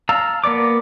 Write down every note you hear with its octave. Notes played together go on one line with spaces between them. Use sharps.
F5 A5 A#5 E6
A#3 B3 D5 D6